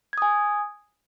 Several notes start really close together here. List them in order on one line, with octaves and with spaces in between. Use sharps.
G#6 D#6 G#5